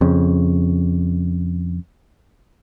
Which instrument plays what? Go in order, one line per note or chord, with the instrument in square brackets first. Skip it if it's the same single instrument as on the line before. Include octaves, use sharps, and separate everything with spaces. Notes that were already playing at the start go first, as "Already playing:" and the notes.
[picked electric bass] F2 C#3